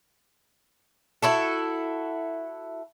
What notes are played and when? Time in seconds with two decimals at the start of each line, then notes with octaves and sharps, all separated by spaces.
1.22 E4 F#4 A4